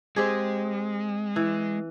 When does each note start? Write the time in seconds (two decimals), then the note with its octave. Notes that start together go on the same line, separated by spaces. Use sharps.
0.16 G#3 C4 G4 G#4
1.36 E3